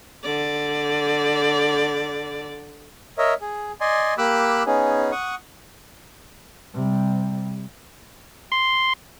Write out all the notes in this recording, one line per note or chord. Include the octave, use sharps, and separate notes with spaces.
D3 D5
A#4 C#5 D#5 E5
G#4
D5 D#5 G#5 C6
A#3 G4 B5 D6 E6 F#6
B3 C#4 D#4 G#4
F#5 C#6 D#6
C3 G3
C6